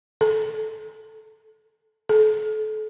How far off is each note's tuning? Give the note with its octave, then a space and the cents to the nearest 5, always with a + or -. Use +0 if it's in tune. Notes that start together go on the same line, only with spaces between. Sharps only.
A4 -15
A4 -35